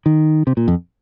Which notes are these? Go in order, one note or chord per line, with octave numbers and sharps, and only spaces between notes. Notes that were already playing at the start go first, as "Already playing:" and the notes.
D#3
C3
A#2
F2